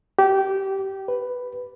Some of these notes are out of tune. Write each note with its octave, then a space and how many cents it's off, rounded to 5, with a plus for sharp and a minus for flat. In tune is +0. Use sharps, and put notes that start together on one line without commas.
G4 -20
B4 +5